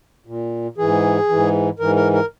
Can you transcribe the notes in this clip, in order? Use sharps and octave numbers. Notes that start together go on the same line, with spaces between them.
A#2
G#2 E3 G#4
G#2 E3
G#2 E3 A#4
A#4
A#4